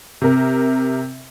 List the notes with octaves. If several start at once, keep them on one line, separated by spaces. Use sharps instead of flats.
C3 A#4